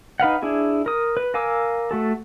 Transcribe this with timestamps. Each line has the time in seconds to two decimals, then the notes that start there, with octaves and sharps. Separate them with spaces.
0.20 D#4 B4 F5 F#5
0.43 D4 E4 G#4
0.86 A#4 D#6
1.17 B4
1.34 A#4 F5 G#5 D6 E6
1.91 A3 F#4 A4